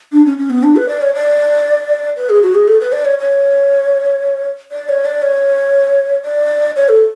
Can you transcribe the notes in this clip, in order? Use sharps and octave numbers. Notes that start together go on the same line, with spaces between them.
D4
C#4
C#4
B3
D4
B4
D5
C#5
D5
B4
G#4
F#4
G#4
A4
B4
D5
C#5
C#5
D5
C#5
D5
C#5
D5
C#5
A4